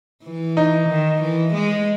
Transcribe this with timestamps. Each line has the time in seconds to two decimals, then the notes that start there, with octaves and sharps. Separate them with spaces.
0.24 E3
0.57 D#4
0.89 D#3
1.22 E3
1.54 G#3